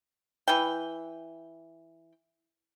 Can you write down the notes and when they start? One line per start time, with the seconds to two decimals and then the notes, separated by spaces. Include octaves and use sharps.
0.48 E3 G5